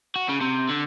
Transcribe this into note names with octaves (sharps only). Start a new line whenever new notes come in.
F#4
C#3
C3
D3